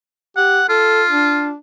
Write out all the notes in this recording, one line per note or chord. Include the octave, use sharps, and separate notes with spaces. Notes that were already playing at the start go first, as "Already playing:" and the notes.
G4 F#5
F4 A4
D4